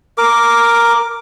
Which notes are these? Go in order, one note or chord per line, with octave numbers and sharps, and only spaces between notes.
A#4 D6